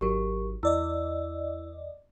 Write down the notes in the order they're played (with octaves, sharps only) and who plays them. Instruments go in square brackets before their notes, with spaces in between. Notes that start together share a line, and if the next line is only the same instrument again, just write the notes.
[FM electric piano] G#1 F#3 [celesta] G4 A#4 C#6
[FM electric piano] E2 D5 D#5 [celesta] E4 E6